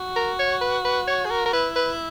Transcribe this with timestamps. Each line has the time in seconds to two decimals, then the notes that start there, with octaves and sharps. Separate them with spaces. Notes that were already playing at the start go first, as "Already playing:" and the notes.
Already playing: F#4
0.16 A#4
0.39 C#5
0.61 B4
0.84 B4
1.07 C#5
1.25 G#4
1.30 A#4
1.45 A#4
1.53 E4 B4
1.76 B4